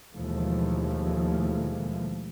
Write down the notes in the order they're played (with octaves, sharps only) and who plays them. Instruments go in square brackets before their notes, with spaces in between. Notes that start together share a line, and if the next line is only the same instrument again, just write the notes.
[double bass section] D#2 B2 E3 F3 G#3 A3